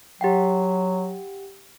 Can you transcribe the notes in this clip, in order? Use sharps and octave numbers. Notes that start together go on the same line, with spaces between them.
F#3 G4 F#5 G5